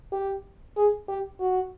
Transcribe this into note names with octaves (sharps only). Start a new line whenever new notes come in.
G4
G#4
G4
F#4